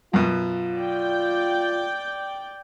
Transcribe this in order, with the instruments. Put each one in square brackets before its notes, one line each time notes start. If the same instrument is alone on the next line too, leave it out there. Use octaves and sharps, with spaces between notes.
[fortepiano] F#2 B2 [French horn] F4
[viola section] D5 G5